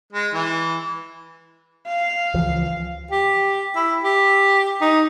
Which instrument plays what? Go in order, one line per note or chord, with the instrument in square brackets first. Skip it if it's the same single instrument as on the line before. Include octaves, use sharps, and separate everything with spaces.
[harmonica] G#3
E3
[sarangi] F5
[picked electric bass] C#2 E3 F3
[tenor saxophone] G4
E4
G4
D#4